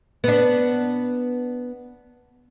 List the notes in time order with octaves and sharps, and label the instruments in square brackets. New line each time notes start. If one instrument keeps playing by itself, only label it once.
[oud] B3 D4